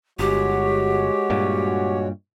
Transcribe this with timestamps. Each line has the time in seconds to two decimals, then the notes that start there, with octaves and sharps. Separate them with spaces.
0.19 G1 G#3 F#4 G4 C#5
1.30 G2 A#2